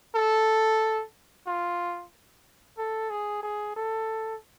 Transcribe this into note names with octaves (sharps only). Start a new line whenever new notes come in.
A4
F4
A4
G#4
G#4
A4